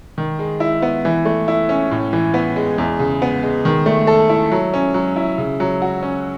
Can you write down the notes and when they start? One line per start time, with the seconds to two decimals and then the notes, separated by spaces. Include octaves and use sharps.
0.18 D#3
0.39 G#3
0.60 E4
0.82 B3
1.05 E3
1.25 A3
1.48 E4
1.69 C#4
1.91 A2
2.13 E3
2.34 B3
2.56 G#3
2.78 E2
2.99 C#3
3.22 B3
3.43 G#3
3.65 D#3
3.86 A3
4.07 A4
4.29 E4
4.52 F#3
4.74 C#4
4.94 F#3
5.16 E4
5.38 C#3
5.60 F#3
5.82 F#4
6.03 C#4